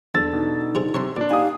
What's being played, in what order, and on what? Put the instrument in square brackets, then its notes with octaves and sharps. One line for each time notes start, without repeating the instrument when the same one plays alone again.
[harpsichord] E2 [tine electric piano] D4 A4 [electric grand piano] E6 A6
[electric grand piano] B2 [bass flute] D#4
[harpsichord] C3 F4 G#4
[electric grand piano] C3 [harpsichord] C#5 A5 C6
[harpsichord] A#2 [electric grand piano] D4 D5
[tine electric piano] D#4 G4 [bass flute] F5 [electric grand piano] G#5 D#6